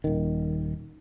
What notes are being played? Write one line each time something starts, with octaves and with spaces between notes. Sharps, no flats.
D#1 D#3